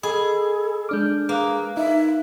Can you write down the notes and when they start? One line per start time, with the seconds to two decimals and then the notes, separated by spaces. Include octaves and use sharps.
0.03 G#4 A4 D#5 B5
0.89 G#3 D4 D6 F6 G6
1.29 A#3 G#4 B4 F5 F#6
1.77 D#4 E5